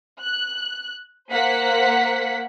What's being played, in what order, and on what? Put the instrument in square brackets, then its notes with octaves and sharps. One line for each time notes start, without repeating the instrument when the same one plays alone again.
[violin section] F#6
A#3 C5 F#5 B6